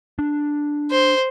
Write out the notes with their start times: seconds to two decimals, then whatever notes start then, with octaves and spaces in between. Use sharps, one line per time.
0.19 D4
0.91 C5